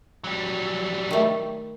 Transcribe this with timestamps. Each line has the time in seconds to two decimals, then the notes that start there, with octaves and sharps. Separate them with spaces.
0.24 F#3 G3
1.11 D#3 A3